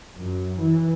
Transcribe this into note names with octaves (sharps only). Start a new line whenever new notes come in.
F#2
E3